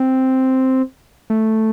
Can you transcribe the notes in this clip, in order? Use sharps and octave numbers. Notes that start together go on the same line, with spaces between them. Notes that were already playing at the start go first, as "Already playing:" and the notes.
Already playing: C4
A3